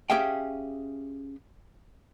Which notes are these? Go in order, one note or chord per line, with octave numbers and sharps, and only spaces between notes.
C#4 G4 G#4 E5 F5 G5